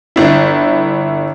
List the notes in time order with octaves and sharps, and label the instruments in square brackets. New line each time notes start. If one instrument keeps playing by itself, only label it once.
[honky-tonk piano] G1 E4